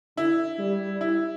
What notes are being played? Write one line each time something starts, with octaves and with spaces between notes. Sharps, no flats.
D3 E4
G3
E4